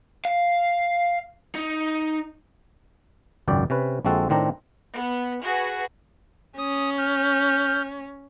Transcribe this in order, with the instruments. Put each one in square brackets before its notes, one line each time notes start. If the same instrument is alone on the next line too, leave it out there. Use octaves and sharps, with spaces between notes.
[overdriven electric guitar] F5
D#4
[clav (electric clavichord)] G#1 C#2 F#2 D5 G5
C3 C#4 B4
A#1 F3 G#3 C4 F#4 A4
A2 D#3 C4 D4 A#5
[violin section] B3
F#4 G#4 B4
[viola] C#4 [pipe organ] D#6
[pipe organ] F6 G6